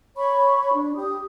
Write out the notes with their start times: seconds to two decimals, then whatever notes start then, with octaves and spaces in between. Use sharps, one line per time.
0.17 C#5 B5 C#6
0.73 D4
0.95 G4 D#6